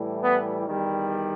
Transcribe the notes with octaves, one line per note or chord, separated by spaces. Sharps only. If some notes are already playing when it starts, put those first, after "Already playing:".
Already playing: A2 E3 G3
B3
E2 D#3 G3